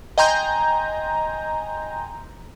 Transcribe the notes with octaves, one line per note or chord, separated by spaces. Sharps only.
D#5 G5 G#5 A#5 C6 G6